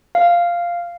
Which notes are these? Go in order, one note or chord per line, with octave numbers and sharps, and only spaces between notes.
F5